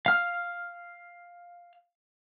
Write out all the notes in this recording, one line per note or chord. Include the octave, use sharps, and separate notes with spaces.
F5 F6